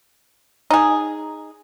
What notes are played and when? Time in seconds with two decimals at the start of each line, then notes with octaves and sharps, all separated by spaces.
0.71 D#4 G#4